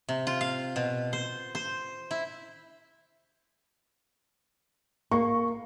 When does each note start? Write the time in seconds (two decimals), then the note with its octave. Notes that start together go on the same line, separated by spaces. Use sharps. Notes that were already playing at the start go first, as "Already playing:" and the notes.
0.09 C3
0.27 F4
0.41 F5
0.76 B2
1.13 C5
1.55 C5
2.11 E4
5.11 A#3 C#6